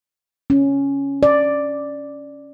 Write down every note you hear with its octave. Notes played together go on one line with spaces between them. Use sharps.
C#4
D5